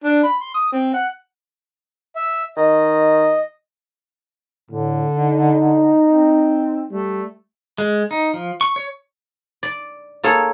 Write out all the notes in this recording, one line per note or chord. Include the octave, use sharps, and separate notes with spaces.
D4
B5
C6
D#6
C4
F#5
E5
D#3 D#5
A2 D3
D#4
C4
G3 A3
G#3
D#4
F3
C#6
C#5
D5
A#3 G#4 A4 C#5